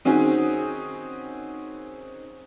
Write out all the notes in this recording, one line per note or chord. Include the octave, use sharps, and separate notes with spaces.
D#3 C4 C#4 D#4 F#4 G#4